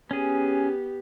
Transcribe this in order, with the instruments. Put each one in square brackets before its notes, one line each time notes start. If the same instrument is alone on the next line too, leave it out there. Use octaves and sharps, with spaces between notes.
[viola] B3 G4 [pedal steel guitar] C#4 G#4